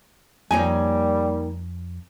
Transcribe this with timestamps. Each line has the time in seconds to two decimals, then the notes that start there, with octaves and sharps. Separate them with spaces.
0.51 F2 D#3 G3 A#3 C#5 G#5